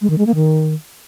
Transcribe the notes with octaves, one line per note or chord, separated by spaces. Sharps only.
G#3
D#3
G#3
A#3
D#3